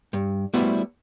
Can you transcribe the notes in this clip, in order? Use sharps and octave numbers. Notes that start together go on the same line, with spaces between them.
G2
G3 A3 B3 E4 F#4 C5